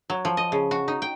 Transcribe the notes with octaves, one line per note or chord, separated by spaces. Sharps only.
F#3
F3
D#5
C#3
F#4
D#4
G5